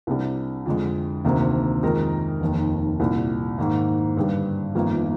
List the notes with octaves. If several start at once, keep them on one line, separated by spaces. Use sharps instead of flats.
C2 C3 G3 D4
F2 D3 G#3
D2 C3 D#3 A#3 D4
F2 D#3 G#3 D#4 A#4
F1 D#2 D#3
C2 A#2 G3
G#2 D#3 A#3
G2 D3 G3
G1 F2 D#3 A#3